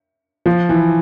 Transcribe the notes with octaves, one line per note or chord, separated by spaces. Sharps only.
F3
E3